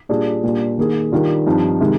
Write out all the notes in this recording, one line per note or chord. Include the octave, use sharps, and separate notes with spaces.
A#2 G3 D4 F4 G#4
A#2 G3 D4
D#3 A#3 D#4 G#4
D#3 G3 D4 F4
G2 F3 C4 D#4
C3 D#3 G#3 D#4